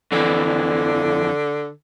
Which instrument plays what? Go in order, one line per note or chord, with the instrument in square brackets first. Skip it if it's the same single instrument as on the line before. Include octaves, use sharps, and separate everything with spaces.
[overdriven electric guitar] F2 E3 [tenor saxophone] D3